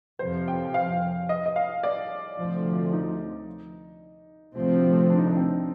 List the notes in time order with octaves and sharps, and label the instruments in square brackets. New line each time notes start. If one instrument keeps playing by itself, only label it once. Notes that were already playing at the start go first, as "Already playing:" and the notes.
[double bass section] F2 C3 F3 [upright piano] C5
[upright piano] G5
F5
D#5
D#5
F5
D5
[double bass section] D2 C3 F3
[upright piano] D#4
[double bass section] D2 C3 F3 A3 C4
[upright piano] D4
D#4
D4
C4